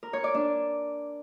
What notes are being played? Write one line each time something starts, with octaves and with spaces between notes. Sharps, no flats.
A#4
C#5
D5
D4